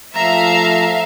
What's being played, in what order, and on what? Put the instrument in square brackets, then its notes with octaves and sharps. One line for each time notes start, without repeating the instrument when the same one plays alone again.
[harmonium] F3 A3 [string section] E5 F5 [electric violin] A#5